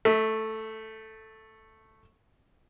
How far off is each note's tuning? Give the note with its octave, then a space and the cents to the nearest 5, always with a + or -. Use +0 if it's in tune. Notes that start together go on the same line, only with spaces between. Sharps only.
A3 +0 E5 -25